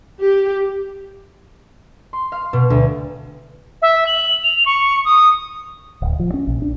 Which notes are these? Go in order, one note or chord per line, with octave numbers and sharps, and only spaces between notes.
G4
C6
F5
B2
D2
E5
F#7
F7
C#6
D#6
D1
F3
C#4
A#1
D4